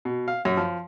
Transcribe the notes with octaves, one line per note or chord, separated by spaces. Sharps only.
B2
F5
F#2
F3